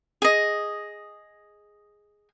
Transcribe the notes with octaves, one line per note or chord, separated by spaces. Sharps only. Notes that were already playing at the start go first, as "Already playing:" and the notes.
G#4 D#5